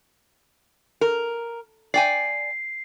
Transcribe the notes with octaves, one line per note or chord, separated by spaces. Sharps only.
A#4
D5 G5 G#5 C7